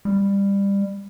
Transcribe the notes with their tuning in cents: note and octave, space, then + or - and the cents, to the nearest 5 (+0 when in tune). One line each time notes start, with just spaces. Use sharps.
G3 +20